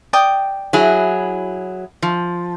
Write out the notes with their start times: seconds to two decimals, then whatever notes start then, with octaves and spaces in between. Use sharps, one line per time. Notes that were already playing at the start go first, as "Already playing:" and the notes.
0.13 D5 G5 D#6
0.73 F#3 E4 G#4
2.02 F3